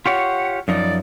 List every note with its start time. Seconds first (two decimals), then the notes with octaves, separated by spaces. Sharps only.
0.06 F4 G4 C#5 F#5
0.68 F#2 F3 D#4 D5